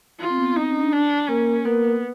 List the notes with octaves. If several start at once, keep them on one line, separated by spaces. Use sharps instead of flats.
F4
C4
B3
C4 D#4
C#4
D4
D4
A#3 C#4 A#4
A#3 B3 A#4